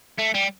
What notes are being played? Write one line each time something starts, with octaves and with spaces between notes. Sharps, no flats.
A3
G3